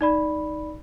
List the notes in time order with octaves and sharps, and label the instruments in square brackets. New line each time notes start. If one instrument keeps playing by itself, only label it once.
[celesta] D#4 D5 B5